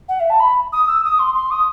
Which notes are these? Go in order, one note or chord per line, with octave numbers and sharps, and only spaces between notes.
F#5
E5
A5
B5
D#6
E6
D#6
C6
C6
D#6